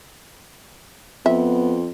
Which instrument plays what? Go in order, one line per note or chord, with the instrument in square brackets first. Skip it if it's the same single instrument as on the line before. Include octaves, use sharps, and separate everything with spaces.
[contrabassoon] F2 [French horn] B3 [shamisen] E5